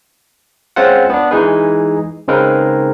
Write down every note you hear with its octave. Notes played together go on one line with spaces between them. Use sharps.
G#3 C4 C#4 F4 C5 F#5
B3 D4
E3 G#3 D#4 G#4 B4
C#3 G#3 C4 D#4 A#4 B4